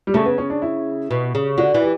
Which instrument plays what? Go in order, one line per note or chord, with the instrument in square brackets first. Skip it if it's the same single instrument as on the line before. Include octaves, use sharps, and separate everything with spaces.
[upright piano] G3
[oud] C#3 [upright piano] A3
[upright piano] B3
C#4
D4
E4
[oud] B2
C#3
[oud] D3 [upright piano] F#4
[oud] E3
[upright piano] G4